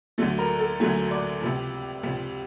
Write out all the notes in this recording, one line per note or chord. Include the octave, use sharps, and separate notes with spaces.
D2 D3 F#3 A3 A4
A#4
A4
D2 D3 F#3 A3 G#4
D5
C#2 C3 F3
C#2 C3 F3